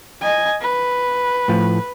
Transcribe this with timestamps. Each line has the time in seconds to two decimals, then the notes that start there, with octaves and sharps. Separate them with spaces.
0.21 D#5 G#5
0.61 B4
1.48 A2 F3